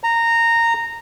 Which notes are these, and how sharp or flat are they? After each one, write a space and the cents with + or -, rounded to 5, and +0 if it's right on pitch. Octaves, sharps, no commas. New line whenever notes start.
A#5 -15